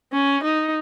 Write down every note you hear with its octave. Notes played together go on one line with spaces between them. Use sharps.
C#4
D#4